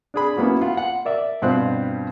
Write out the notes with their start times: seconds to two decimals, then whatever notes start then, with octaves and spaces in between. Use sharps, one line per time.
0.14 D4 G#4 B5
0.37 F#3 A#3 B3 C#4 E4
0.62 F4 F#5
0.77 F#5
1.05 A#4 D5 E5
1.42 G2 B2 C4 F4 F#6